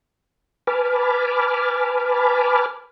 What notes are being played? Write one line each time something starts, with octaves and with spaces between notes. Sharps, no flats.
B4 G#5 A5 B5 D6 F6